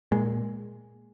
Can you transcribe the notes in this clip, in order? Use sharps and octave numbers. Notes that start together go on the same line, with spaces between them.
A#2 G#3